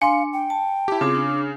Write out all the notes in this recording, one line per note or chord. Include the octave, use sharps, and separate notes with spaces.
D4 F5 G#5 C6 C#7
G5
A5
E4 G4
C#3 C4 F4 G#4 D6
D4